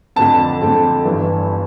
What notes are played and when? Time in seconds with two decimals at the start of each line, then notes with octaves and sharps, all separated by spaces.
0.16 F2 D3 A3 C4 A5
0.61 F2 D3 A3 C4
1.05 G1 G2 E3